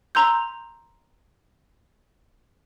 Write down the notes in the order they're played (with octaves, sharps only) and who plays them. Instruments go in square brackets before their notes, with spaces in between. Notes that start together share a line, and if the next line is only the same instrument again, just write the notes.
[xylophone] A#5 C6 E6 G6